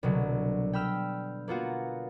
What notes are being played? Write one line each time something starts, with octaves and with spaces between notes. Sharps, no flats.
C2 B2 D3 F#3
G5 B5 E6 F6
A#3 B3 F4 F#4